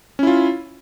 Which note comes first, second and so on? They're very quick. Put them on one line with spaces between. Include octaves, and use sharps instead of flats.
C#4 E4 F4